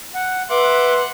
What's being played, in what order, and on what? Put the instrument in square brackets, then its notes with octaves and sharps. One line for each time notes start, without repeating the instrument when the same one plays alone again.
[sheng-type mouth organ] F#5
[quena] B4 [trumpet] E5 [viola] F#5 C6 [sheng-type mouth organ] D6